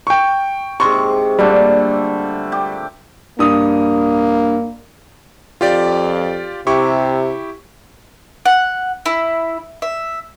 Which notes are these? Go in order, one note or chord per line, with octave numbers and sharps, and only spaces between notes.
G5 C#6
G#2 C3 C6 C#6
A#2 D3 G3 A3
G4
G2 A#3 D#6
F2 F4 G4 D5
C3 E4 G4 C#6
F#5
E4
E5